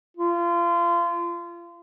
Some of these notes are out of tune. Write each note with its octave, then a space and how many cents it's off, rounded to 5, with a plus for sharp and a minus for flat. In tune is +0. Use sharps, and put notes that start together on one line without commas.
F4 -30